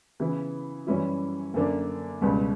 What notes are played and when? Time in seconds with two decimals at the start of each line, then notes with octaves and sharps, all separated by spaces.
0.20 C#3 E3 B3 E4
0.87 F#2 E3 G3 C#4 E4
1.54 F#2 D3 A#3 D4
2.21 C#2 B2 G3